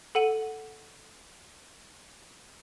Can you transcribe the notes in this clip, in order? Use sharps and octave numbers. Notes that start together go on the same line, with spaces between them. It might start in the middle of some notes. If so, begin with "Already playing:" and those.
A4 F#5 D#7 F#7